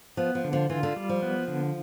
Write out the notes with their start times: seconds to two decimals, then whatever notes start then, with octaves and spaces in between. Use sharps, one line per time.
0.17 F3 B3
0.35 F3
0.44 D3
0.53 F3
0.70 E3 F4
0.83 D3
0.96 G3
1.09 F3
1.22 B3
1.48 D3